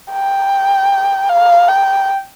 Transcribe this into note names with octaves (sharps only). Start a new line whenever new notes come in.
G5
F5
G5